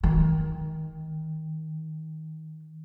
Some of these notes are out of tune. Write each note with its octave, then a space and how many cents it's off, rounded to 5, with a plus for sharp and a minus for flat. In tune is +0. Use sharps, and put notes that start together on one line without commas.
D#3 +20